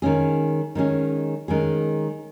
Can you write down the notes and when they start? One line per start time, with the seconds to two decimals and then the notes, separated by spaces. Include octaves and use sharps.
0.02 D#3 G#3 C#4 G#4
0.75 D#3 G#3 C#4 G#4
1.48 D#3 G#3 C#4 G#4